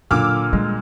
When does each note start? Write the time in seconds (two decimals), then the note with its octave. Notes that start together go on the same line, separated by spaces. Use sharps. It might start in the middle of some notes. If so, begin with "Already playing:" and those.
0.11 F#2 A#2 D3 D6 E6 F6
0.53 G3 G#3